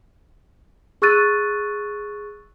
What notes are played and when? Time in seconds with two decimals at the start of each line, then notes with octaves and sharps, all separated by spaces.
1.02 G#4 C#6 E6 F#6 A6 D#7